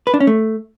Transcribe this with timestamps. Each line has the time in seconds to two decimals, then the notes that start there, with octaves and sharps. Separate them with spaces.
0.07 B4
0.14 D4
0.20 C#4
0.27 A3